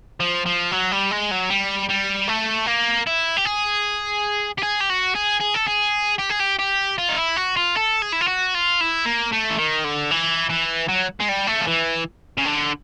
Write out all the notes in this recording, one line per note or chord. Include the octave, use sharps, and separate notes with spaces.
F3
F3
F#3
G3
G#3
F#3
G3
G3
A3
A#3
E4
G4
G#4
G4
G#4
G4
F#4
G#4
G#4
A4
G#4
G4
G#4
G4
G4
F4
D#4
E4
F#4
F4
A4
G#4
E4
F4
F#4
F4
E4
A#3
A3
E3
D#3
D3
E3
E3
F#3
G#3
G3
A3
F3
E3
C#3
D3